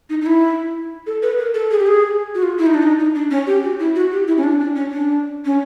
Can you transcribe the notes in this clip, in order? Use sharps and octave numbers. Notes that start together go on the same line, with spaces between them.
D#4
D#4
E4
A4
B4
A#4
A4
G#4
G4
G#4
F#4
F4
E4
D#4
D4
D#4
D#4
D4
C#4
G4
F#4
E4
F#4
G4
E4
C#4
D4
D4
C#4
D4
C#4